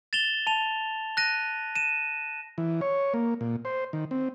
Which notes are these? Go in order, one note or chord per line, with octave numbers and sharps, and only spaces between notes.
A6 E7 F7 G7
A5 F7
F#6 A#6 D#7
D#7 E7
E3
C#5
A#3
A#2
C5
D#3
C4